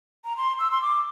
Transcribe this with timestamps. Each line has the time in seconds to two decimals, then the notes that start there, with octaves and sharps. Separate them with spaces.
0.25 A#5
0.37 C6
0.59 E6
0.71 C6
0.82 D6